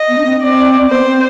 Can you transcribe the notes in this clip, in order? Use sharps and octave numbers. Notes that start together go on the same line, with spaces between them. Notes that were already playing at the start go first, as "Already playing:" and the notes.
Already playing: D#5
B3
D4
C4
C4 D5
C4
B3 C5
C4